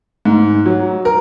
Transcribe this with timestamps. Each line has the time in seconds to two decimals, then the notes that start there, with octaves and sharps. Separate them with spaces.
0.25 G#2
0.66 F#3
1.05 A#4